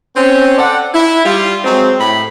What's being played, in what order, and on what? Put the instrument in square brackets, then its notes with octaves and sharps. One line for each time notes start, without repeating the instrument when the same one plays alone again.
[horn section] C4 C#4
A4 D5 F#5
E4
G3 F4
F#3 G#3 C4
A2 B5